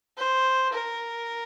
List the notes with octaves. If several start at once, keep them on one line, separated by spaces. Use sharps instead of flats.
C5
A#4